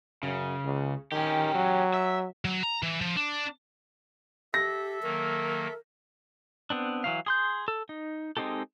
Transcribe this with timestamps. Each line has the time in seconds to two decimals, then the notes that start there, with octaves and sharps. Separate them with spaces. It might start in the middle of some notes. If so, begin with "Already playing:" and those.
0.23 F#2 C#3
0.65 C#2
1.12 D#3 C#4 G4
1.55 F#3
1.94 E5
2.45 F#3
2.63 A#5
2.83 E3
3.01 F3
3.16 D4
4.54 G4 A4 E5 A#6
5.02 D#3 F#3 A#3 A#4
6.70 B3 C4 D4
7.04 E3 F#3 F5
7.26 G#4 C6 G6
7.68 A4
7.89 D#4
8.37 G#3 C4 D#4 G4 A4